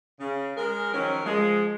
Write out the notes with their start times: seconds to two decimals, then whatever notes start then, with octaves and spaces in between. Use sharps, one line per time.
0.19 C#3
0.55 G#3 G#4 A#4
0.91 D#3 F3 F#3 C#4 A#4
1.24 F3 G#3